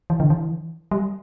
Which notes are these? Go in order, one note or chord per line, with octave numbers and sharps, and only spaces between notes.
E3
D3
E3
G3